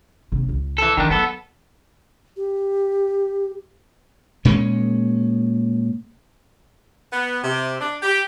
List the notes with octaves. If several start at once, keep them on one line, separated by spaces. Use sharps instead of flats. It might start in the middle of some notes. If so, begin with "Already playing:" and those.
A#1 C3
C#2
E3 A4
D#3 F3 D4
F#3 B3 A4
G4
A#2 G#3 C#4
B3
C3
D4
G4